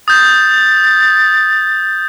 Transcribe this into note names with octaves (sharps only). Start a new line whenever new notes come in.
D#6 G6 A6